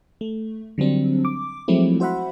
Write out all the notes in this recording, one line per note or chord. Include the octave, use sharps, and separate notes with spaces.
A3
D3 F#3 G3 C4 D4
D6
F3 F#3 G#3 A3 C4 E4
F#4 C5 E5 F#5 B5